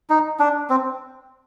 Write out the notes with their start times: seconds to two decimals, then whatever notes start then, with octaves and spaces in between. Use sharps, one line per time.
0.10 D#4
0.39 D4
0.70 C4